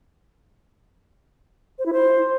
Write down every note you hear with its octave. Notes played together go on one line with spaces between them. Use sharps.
C5
E4
C5